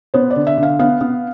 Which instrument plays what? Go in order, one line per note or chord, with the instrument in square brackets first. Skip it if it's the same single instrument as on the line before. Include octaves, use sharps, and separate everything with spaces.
[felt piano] B3 C5
D5
D3
E5
D3
F5
B3 F5
B3